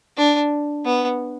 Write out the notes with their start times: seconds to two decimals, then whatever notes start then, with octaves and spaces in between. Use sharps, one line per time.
0.17 D4
0.85 B3